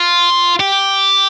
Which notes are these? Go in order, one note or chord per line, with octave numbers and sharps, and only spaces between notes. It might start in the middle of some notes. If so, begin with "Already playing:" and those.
Already playing: F4
G4